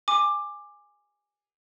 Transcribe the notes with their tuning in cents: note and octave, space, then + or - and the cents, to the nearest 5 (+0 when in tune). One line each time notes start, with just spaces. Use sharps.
G#5 -10 D6 +15